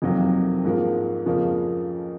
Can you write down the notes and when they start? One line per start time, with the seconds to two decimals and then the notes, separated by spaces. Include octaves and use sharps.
0.02 F2 C3 D#3 F#3 A#3
0.65 G#2 F3 A#3
1.26 F2 C#3 F3 A#3 C#4